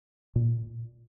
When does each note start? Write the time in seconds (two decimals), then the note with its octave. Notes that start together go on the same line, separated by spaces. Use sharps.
0.36 A#2